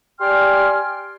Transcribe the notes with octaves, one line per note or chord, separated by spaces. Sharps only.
G4 D5 G5 G#5 C6 F6